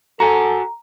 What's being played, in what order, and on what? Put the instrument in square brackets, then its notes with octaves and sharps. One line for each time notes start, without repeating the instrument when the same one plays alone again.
[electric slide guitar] F#4 F#5 G#5 [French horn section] A4 [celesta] A#5